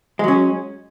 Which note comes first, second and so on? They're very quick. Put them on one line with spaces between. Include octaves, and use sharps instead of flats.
G#3 F#3 C#4